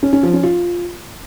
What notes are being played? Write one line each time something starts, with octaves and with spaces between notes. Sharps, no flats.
C#4
C#4
F3
C#4
F4